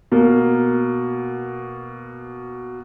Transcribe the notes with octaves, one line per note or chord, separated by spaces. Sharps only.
B2 A#3